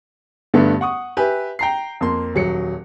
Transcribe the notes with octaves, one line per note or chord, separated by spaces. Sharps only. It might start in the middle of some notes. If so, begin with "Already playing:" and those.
G2 D3 A3 B3 D4
F#5 C#6 D#6
G4 B4 E5 G#5
G5 A#5 C7
F2 A#3 C6
D#1 F#3 C#7